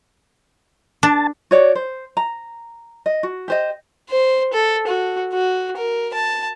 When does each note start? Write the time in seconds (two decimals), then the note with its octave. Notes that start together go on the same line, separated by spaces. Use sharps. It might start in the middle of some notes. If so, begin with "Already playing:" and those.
1.03 D4 A5
1.51 F#4 C#5 D5
1.75 C5
2.17 A#5
3.06 D#5
3.23 F#4
3.48 G4 C5 D#5
4.09 C5
4.53 A4
4.88 F#4
5.33 F#4
5.77 A#4
6.14 A5